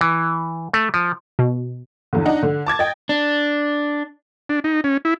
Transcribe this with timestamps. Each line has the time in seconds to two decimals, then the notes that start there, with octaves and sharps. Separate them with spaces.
0.01 E3
0.74 A3
0.94 F3
1.39 B2
2.13 E2 D3
2.26 D4 D#4 F#5
2.43 D3
2.66 A5 D6 G#6 A6
2.79 D#5 G5
3.09 D4
4.49 D4
4.64 D#4
4.84 C#4
5.05 E4